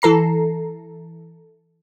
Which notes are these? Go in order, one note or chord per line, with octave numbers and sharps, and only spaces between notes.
E3 A4 A#5 C7